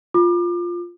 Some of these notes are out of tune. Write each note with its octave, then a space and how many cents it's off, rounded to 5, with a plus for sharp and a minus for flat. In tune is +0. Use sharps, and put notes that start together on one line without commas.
F4 +0 D6 +30